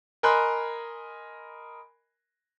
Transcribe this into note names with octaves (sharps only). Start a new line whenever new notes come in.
A#4 D#5 G#5 B5 C6 F#6